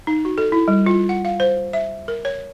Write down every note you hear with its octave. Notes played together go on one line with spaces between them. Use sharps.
D#4
F#4
A4
E4
G3
F4
F#5
F5
C5
E5
A#4
C#5